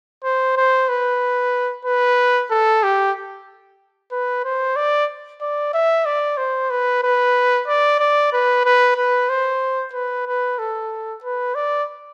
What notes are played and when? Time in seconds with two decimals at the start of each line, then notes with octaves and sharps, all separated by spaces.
0.24 C5
0.57 C5
0.89 B4
1.85 B4
2.51 A4
2.83 G4
4.12 B4
4.44 C5
4.76 D5
5.41 D5
5.74 E5
6.05 D5
6.38 C5
6.70 B4
7.03 B4
7.67 D5
7.99 D5
8.33 B4
8.65 B4
8.97 B4
9.29 C5
9.93 B4
10.27 B4
10.59 A4
11.23 B4
11.55 D5